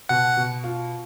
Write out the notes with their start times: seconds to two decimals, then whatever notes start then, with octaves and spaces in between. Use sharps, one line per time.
0.09 B2 F#5
0.37 B2
0.64 F4